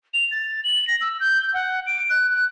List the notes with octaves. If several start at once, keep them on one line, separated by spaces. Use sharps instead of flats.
F7
A6
F#7
A#6
E6
G6
F#5
D7
F#6
F#6